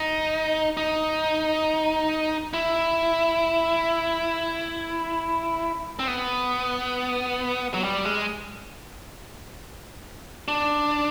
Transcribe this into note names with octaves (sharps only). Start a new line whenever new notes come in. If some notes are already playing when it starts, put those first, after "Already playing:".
Already playing: D#4
D#4
E4
C4
B3
F#3
G3
G#3
D4